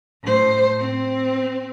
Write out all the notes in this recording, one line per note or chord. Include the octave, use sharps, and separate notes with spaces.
A2 C5
C4